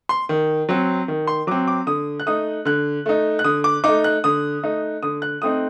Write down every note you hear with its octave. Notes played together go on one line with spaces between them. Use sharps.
C6
D#3
F#3 C4
D#3
C6
F#3 C4 D6
D6
D3 D#6
F#6
A3 D#4 D#6
D3 F#6
A3 D#4
F#6
D3 D#6
D6
A3 D#4 D6
F#6
D3 D#6
A3 D#4
D3 D#6
F#6
A3 C4 D#4 D#6